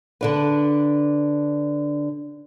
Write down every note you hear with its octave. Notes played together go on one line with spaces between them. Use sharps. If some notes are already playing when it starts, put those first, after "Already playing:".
D3 D4 B4